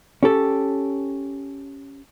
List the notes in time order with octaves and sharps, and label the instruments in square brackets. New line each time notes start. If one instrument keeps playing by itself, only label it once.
[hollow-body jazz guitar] C#4 G4 A4